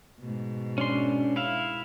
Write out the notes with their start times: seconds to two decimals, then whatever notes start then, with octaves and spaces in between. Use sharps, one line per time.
0.21 G#2 B2
0.78 C#4 D4 C6
1.36 E4 E5 F5